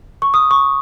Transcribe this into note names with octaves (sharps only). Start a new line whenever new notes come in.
C#6
D#6
C#6